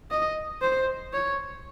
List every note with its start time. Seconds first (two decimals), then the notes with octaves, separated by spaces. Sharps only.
0.11 D#5
0.62 C5
1.13 C#5